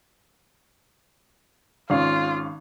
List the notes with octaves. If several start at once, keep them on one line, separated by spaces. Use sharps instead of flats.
G#1 C#4 F4 F5